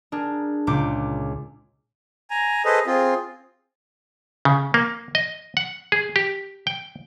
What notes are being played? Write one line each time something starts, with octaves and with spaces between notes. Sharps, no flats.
D4 G#4 A#4
C#2 A#2 D6 G6
G#5 A#5
G#4 A4 B4 C5 D#5
C4 F4 G#4
C#3
A#3
D#5
F#5
G#4
G4
G5